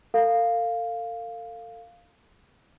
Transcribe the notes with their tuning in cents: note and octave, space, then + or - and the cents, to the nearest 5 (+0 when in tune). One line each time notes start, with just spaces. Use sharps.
A4 +40 F5 +0